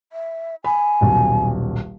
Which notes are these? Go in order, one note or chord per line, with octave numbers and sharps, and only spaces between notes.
E5
G#5 B5
D#1 B1